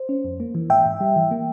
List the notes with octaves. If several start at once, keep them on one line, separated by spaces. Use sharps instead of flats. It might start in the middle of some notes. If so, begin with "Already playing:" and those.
Already playing: C5
C#4
F2
A#3
E3
G#2 E5 G5
G#2
G3
E3
A#3